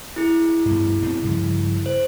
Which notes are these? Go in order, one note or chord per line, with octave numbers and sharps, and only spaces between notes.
E4 G#4
G2 B2
B2 A3 C4
G2 C#3 F3
C5